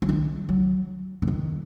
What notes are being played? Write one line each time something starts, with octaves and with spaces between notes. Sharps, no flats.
F#3
D#3
F#3
D3
D#3